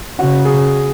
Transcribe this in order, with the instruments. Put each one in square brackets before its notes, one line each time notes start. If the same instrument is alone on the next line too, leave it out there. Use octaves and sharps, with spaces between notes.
[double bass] C#3 [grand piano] F#4
[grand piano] G#4